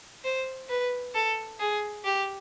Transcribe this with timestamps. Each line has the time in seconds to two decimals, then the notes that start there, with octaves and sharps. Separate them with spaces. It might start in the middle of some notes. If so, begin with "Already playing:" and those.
0.24 C5
0.69 B4
1.14 A4
1.59 G#4
2.04 G4